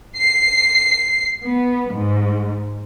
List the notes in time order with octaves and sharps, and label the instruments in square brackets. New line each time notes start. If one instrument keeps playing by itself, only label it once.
[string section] C7
B3
G#2